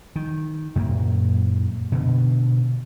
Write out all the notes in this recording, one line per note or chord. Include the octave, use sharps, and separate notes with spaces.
D#3
F#2 A#2 A#3
B2 D3